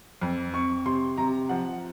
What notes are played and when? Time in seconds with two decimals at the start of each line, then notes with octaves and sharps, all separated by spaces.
0.22 F2
0.53 C4 C#6
0.86 C3 C6
1.17 C3 A#5
1.49 F3 F#5